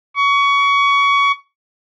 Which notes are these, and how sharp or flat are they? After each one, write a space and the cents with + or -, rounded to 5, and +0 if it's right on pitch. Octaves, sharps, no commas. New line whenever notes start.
C#6 +25